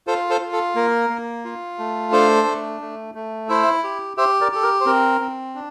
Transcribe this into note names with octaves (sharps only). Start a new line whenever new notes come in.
F4 A4 C5
A4 C5
F4
A4
A#3 A#4
A#3
F4
A3
D4 A4 C5
A3
A3
A3
E4 C5 E5
G4
G4 C5 E5
A#4 D5
G4 A4
A#4
C5
C4 A#4
C4
D4